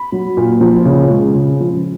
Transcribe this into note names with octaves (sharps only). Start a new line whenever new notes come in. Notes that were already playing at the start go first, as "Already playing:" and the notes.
Already playing: B5
F#3
A#2
F3
C#3
G#3
C#3
F3